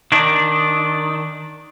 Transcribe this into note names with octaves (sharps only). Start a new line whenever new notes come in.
D#3 D4